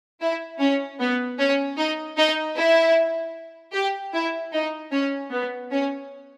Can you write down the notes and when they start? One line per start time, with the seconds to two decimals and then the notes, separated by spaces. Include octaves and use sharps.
0.21 E4
0.60 C#4
1.00 B3
1.39 C#4
1.78 D#4
2.18 D#4
2.57 E4
3.74 G4
4.14 E4
4.53 D#4
4.92 C#4
5.31 B3
5.71 C#4